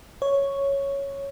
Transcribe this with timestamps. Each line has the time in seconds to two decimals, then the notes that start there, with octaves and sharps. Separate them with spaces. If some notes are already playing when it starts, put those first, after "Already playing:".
0.22 C#5